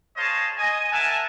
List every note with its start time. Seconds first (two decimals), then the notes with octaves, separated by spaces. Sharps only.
0.17 G#4 C5 C#5 D#5 F5 A5
0.58 D#5 G#5
0.92 A#4 E5 F#5 G#5 A5